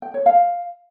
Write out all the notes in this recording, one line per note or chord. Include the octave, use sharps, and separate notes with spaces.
G5
C#5
F5